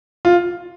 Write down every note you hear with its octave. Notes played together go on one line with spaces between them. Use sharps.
F4